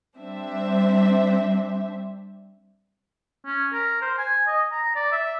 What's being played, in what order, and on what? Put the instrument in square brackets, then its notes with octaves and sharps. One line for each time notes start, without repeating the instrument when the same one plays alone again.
[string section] G3 C4 D4 C5 E5
[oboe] C#4
A#4
C5
G#5
D#5
A#5
D5
E5